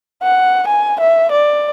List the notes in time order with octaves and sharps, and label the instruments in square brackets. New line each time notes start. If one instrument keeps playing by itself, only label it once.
[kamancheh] F#5
G#5
E5
D5